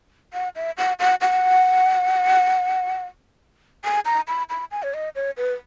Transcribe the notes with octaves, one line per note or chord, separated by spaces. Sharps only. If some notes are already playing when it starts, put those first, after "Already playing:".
F#5
E5
F#5
F#5
F#5
G#5
A#5
B5
B5
G#5
C#5
D#5
C#5
B4